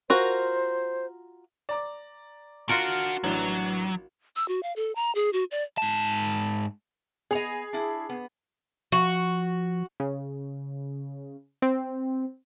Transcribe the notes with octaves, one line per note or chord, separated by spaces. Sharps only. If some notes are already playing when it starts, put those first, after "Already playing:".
F4 F#4 A#4 C5
D5 A#5 D6
D4 F4 F#4 A#4 F#5
A1 E3 F#3 D4
E6
F#4
F5
A4
A#5
G#4
F#4
D5
G#2 A5
B3 G#4 D#5 F7
D4 E4
B3
F3 F#4
C#3
C4